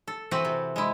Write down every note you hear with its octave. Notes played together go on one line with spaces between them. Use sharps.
A4
E3 C4 F#4 B4 F#5
C3
G#3 E4